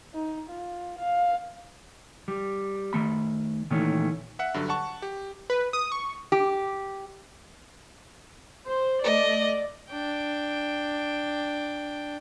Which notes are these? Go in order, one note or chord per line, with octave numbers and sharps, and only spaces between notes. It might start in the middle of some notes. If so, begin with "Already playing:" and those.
D#4
F4
F5
G3
D#3 A3 B5
A#2 D#3 E3 A3 C#4
E5 F#5
G2 D3 F#3
F#5 A5 C#6
G4
B4
D#6
C#6
G4
C5
A3 D5 D#5
D4 G5